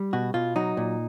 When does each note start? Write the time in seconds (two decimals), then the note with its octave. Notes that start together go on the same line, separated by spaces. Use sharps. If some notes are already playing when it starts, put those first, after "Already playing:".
Already playing: G3
0.13 B2 F#4
0.34 B2 F4
0.56 F#3 D#4
0.77 A#2